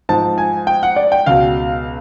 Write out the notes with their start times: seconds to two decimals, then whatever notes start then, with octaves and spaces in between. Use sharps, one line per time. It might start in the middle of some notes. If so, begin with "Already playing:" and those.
0.09 G#2 F3 A5
0.38 G#5
0.67 G5
0.83 F#5
0.96 D5
1.12 G5
1.26 C#2 B2 F5